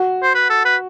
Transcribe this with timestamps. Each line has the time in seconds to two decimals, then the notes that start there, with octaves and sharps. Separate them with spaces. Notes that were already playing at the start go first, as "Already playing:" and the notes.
Already playing: F#4
0.23 C5
0.35 B4
0.50 A4
0.65 B4